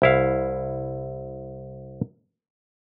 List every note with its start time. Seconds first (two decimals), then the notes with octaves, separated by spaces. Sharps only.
0.02 C2 E4 F5